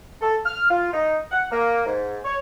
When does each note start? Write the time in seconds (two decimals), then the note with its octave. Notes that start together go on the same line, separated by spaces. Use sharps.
0.21 A4
0.45 F6
0.70 F4
0.93 D#4
1.31 F#5
1.51 A#3
1.86 G#2
2.24 C#5